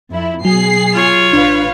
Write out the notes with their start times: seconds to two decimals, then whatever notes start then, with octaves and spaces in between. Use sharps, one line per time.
0.11 F2 E4
0.45 B2 F#3 G#4 C7
0.93 F4 C#5
1.33 A1 D4 B4 F5